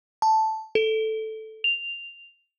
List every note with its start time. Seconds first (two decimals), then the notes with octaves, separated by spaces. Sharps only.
0.22 A5
0.75 A4
1.64 F7